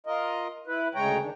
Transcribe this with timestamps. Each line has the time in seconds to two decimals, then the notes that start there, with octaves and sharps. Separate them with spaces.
0.07 F4 A#4 D#5
0.67 E4 B4
0.95 D2 C#3 G#3 C#5 G5 A#5
1.22 D#3 D4